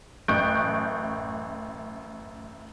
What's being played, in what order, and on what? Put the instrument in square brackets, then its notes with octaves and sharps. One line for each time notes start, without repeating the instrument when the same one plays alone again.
[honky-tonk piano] A1 F#2 C#6 F#6 G6 D7